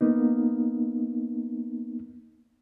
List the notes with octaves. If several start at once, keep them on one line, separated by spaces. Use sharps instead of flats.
A#3 B3 D#4